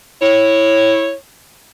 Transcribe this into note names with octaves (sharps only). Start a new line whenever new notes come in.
E4 C#5